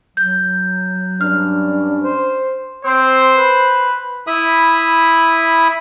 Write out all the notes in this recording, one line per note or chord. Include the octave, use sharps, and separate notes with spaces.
F#3 G6
G2 C#4 D4 F6
C5
C4 C5
B4
E4 E5 B5 D#6